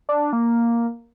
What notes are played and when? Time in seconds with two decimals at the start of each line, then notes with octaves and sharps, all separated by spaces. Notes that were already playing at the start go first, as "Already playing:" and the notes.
0.09 D4
0.33 A#3